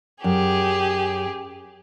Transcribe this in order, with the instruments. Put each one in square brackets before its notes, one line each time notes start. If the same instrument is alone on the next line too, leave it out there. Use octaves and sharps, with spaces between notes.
[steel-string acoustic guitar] F#2 [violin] G4 G#4